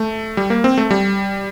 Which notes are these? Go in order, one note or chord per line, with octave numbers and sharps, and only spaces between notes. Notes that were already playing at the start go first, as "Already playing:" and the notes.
Already playing: A3
G3
A#3
C4
A3
G3